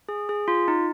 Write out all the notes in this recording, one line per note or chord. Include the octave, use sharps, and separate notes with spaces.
G#4
G#4
F4
D#4